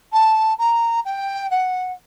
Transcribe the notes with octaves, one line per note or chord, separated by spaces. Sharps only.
A5
A#5
G5
F#5